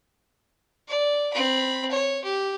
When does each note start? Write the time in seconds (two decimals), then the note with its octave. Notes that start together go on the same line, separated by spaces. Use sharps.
0.88 D5
1.33 C4 B5
1.91 C#5
2.24 G4